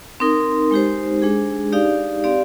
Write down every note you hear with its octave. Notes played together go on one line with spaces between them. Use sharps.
C4 D#4 A#4
G#3 D#4 G4 C5
G#3 D4 G#4
D#4 G4 D5 F5
C4 G4 D5 F5